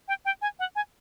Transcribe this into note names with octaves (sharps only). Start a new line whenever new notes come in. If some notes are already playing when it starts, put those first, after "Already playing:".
G5
G5
G#5
F#5
G#5